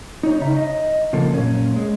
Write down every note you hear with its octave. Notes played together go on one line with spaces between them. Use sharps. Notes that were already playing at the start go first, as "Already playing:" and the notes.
D#4 C#5
C#3 D#4 E5 A#5
D#5
C#3 F3 A#3 A4
F#2 A#2 C#4
G#3